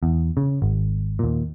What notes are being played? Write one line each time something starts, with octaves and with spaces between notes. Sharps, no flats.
E2
C#3
G#1
D#2 A#2